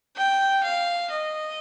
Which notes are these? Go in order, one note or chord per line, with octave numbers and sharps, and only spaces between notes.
G5
F5
D#5